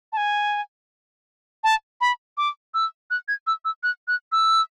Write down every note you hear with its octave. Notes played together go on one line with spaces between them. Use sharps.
A5
G#5
A5
B5
D6
E6
F#6
G#6
E6
E6
F#6
F#6
E6